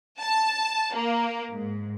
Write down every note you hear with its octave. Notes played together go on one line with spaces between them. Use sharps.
A5
A#3
G#2